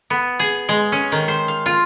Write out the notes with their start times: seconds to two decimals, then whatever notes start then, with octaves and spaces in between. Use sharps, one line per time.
0.10 B3
0.39 G#4
0.69 G#3
0.92 C#4
1.12 D#3
1.28 C5
1.48 F5
1.66 F4